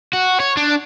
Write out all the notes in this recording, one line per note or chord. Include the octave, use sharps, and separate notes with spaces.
F#4
C#5
D4